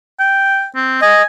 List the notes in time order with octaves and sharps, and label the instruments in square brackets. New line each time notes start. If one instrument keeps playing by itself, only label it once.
[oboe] G5
C4
[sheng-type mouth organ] D#5 [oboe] G#5